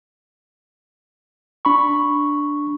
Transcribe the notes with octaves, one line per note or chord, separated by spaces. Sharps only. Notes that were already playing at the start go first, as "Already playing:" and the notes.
D4 B5 C#6